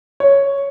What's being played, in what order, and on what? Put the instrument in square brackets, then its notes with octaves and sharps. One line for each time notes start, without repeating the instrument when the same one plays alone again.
[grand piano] C#5